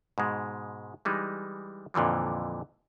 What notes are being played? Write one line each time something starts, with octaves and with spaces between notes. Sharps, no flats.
G#2 B2 G#3
E3 G3 G#3 D#4
F2 A#2 D3 E3 F3